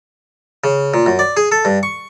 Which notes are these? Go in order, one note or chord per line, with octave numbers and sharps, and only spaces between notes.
C#3
A#2
F#2
D5
G#4
A4
G2
C#6